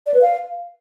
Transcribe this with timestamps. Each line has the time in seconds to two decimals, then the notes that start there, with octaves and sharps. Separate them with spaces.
0.07 D5
0.14 B4
0.21 F5